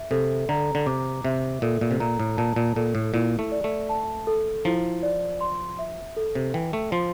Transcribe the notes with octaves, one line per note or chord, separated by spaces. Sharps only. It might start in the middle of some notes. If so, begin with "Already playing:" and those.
Already playing: E5
C3 A4
D3 A#5
D3
C3 D6
C3 E5
A#2 A4
A#2
C3
A#2 A#5
A2
A#2 A5
A#2
A#2 A4
A2
A#2 E4
A3
D5
A3
A5
A4
F3 E4
D5
C6
E5
A4
C3
E3 G5
A3
F3 C6